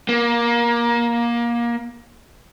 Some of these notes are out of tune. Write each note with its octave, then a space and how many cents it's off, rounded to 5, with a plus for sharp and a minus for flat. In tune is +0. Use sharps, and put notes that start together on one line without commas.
A#3 +20